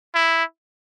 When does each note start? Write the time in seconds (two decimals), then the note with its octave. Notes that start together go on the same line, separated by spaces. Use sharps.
0.14 E4